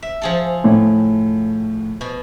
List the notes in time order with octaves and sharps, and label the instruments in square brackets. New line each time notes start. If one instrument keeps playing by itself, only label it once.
[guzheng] E5
F3 G#4 A4
[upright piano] A2
[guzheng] B2